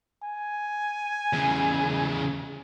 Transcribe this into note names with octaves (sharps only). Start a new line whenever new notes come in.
G#5
E2 C#3